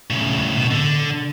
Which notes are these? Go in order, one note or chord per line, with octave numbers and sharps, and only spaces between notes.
A2 C#3
B2
D3